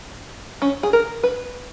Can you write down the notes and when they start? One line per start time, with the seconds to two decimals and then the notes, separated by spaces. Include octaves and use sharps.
0.62 C#4
0.83 G#4
0.93 A#4
1.23 B4